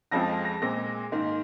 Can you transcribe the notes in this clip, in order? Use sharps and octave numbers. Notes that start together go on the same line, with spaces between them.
F2 F3 G#3 C4 A#6
A#6
A#2 G#3 C4 A#6
G#2 D#3 A#3